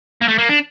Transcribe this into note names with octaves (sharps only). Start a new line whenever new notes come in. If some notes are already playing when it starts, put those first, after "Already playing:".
A#3
A3
A#3
D4